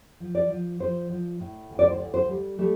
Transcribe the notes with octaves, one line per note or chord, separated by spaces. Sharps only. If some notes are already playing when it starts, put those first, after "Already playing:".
F3
D5
F3
F3 C5
F3
A2
D2
D5
C5
D2 D5
C5
G3
G3 A3